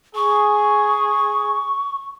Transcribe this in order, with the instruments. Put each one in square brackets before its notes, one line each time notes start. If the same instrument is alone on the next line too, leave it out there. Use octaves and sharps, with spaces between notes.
[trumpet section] G#4 [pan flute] C#6